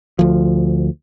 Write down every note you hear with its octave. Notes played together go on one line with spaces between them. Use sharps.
D2 F3